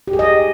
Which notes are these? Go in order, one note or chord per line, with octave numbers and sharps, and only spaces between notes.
G4
G#4
D#5